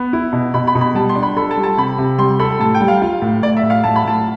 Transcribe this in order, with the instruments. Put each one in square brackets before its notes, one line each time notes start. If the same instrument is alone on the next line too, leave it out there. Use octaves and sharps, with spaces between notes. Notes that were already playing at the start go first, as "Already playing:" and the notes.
Already playing: [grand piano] B3
E4
B2
[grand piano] B2 [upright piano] B5
[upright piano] B5
[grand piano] B2
[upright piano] B5
[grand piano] G3 [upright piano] A5
[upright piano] C6
[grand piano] D4
[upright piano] B5
[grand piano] A4 [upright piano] B5
[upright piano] A5
[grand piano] G3
[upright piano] A5
[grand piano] C3 [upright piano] B5
[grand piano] C3
[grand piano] G3 [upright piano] C6
[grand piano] A4 [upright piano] B5
[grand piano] A2 [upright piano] A5
[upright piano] G5
[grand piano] G3
[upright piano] F5
[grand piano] F4
A2
[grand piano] A2 [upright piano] D5
[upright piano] E5
[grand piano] A2
[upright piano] F5
[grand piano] A2 [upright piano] A5
[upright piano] B5
[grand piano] A2 [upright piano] A5